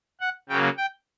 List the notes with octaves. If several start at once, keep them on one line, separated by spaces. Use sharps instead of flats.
F#5
C#3 F#3 A#3 G5
G5